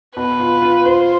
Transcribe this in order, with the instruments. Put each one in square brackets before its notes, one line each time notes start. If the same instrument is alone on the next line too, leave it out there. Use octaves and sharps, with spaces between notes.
[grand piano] B2 [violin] B4
[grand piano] F4
F4
[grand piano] F4 [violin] C5